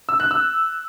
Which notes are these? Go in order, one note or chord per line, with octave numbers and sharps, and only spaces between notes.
E6
F#6
E6